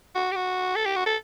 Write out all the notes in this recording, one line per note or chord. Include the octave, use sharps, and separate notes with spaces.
F#4
G4
F#4
A4
G4
F#4
A4